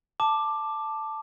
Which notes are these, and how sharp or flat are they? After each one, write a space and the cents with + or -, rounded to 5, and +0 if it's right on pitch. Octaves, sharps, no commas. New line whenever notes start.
A5 +0 D6 +10